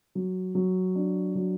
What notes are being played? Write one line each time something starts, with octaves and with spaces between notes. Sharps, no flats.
F#3
F#3
D4
F#3